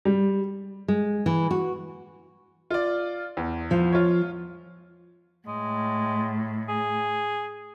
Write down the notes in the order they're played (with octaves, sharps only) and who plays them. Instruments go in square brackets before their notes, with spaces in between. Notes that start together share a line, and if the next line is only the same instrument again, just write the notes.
[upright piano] G3
[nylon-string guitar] G#3
E3
F#4
[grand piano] F4 D5
E2
[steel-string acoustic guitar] F3
[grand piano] F4 C#5
[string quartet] A2 [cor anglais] G#3
[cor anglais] G#4